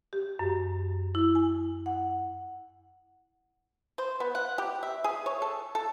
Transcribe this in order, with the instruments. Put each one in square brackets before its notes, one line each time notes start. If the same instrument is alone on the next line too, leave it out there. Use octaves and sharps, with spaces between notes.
[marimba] G4
F#2
E4
G#5
F#5
[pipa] C5
B3
F#5
G4
E5
G#4
C#5
A4
A4